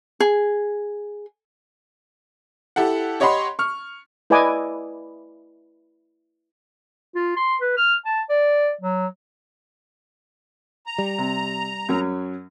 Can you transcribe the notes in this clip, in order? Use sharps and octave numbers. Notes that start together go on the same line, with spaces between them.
G#4
E4 G4 A4 F#5
G4 C#5 D#5 F#5 B5 C6
C#6 F6
E4 B4 D5 D#5 G#5 D6
F4
C6
B4
F6
A5
D5
F#3
A#5
G3
C3
F#2 F#3 C#4